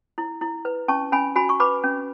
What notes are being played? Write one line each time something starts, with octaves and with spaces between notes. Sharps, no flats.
E4
E4
B4
C#4 A5 C#6
C#4 G#5 B5
F#4 G#5 B5
C#6
B4 B5 D6
C#4